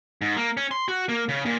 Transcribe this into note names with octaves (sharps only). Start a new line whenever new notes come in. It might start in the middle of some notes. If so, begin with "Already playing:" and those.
G#2
A#3
C#4
C6
F#4
A#3
C#3
A#2